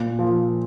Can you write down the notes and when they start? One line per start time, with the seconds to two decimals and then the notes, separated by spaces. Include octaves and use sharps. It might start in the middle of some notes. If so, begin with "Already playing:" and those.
Already playing: A#2
0.19 F3